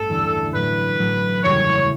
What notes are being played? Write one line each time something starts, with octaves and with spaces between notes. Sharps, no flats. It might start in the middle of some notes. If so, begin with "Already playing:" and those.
Already playing: A1 G2 A3 A4
E2 D3 G3 D4
A2 F#3 A3 B4
A2 F#3 A3
F#1 E2 C#3 G3 C#5